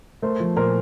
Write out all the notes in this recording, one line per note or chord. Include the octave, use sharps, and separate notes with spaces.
A3 A#4 C5
F3
A#2 A#4 C5